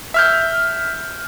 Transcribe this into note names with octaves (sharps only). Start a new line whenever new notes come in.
E5 F6 G6